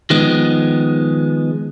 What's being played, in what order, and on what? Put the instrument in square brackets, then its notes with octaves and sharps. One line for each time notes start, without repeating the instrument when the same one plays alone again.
[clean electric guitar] D#3 F3 G#3 B3